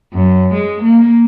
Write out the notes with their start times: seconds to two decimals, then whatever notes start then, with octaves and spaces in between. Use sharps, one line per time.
0.14 F#2
0.53 G#3
0.82 A#3